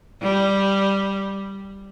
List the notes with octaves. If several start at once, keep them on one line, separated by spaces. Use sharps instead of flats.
G3